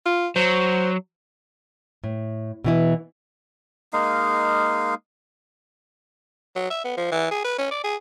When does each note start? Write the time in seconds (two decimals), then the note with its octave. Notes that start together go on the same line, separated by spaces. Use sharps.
0.06 F4
0.36 F#3 C5
2.04 A2
2.64 B2 E3 E4
3.93 G#3 A#3 D#4 F5
6.56 F#3
6.70 E5
6.84 B3
6.97 F3
7.12 E3
7.31 G#4
7.45 B4
7.58 C#4
7.71 D5
7.84 G#4